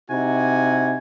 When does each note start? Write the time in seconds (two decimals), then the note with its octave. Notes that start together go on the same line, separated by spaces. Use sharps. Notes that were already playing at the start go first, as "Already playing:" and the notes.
0.10 C3 D#4 E4 F#4 G#5